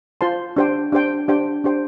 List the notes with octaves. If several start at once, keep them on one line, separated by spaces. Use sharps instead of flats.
F4 C5 A5 C6
D4 G4 C5 G5
D4 G4 C5 G5
D4 G4 C5 G5
D4 G4 C5 G5